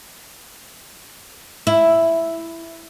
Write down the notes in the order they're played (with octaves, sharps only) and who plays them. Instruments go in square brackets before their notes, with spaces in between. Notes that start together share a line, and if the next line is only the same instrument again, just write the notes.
[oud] E4